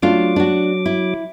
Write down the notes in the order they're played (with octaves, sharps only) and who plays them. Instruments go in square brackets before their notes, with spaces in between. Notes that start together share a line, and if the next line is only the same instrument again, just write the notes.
[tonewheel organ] F#3 D6 [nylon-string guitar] A3 D4 F4
[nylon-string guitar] D4 F#4
E4